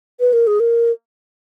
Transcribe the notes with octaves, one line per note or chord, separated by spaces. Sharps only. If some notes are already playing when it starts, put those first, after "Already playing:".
B4
A#4
G#4
A#4